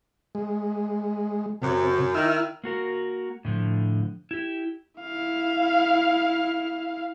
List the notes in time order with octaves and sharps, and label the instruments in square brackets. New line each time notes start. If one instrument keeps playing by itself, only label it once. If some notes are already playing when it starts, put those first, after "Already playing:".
[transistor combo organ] G#3
[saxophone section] F#2 [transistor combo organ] C3
[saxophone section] D#3 [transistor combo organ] E4 E6 F6
[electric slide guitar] A#3 F#4 A#4
A2 D3 F3
E4 G4
[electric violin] E4 F5